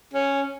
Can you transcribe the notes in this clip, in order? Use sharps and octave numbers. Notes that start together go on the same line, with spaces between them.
C#4